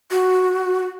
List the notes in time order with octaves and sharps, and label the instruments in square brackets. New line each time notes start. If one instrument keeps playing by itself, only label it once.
[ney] F#4